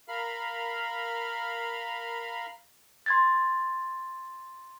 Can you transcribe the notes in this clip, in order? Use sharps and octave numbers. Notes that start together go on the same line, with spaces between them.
A#4 F5 B5 F6
C6 G#6 A6